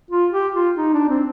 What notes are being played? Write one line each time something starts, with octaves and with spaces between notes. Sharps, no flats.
F4
G4
F4
D#4
D4
C4